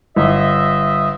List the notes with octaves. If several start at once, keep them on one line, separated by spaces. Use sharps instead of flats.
G1 D#5 E5